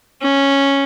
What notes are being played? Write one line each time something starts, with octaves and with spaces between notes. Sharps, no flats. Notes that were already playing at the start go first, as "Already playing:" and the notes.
C#4